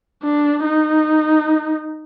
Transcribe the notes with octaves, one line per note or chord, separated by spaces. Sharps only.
D4
D#4